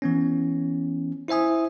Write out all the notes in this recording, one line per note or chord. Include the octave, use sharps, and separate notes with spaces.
E3 B3 C#4
E4 C5 E5 G#5 D#6